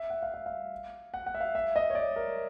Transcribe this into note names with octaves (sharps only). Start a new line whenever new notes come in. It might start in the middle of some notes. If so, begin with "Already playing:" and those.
Already playing: E5
F#5
F5
E5
F5
F#5
F#5
E5
F5
E5
D#5
C#5
D5
A#4